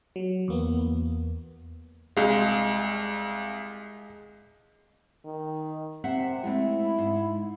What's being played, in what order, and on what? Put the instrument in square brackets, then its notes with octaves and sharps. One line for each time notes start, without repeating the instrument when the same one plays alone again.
[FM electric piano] F#3
E2 A#3 B3
[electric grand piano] C2 F5 [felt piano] G#3
[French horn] D#3
[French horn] C3 [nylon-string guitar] C4 E5 F#5
[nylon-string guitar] G#3 A3 C4 [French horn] E4
[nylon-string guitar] G#2